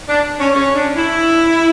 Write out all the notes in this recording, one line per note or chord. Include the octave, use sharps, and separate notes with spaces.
D4
C#4
C#4
D4
E4